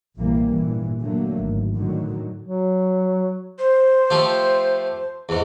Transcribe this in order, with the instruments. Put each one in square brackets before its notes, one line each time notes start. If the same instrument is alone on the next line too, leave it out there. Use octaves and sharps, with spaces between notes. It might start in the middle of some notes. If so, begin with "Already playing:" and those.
[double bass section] A#1 C3 E3 G3 A#3
G1 A#2 E3
D3 F#3 A3 A#3
G#1
A2 D3 D#3 F#3
[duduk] F#3
[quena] C5
[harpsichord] F3 A3 G4
E2 G#2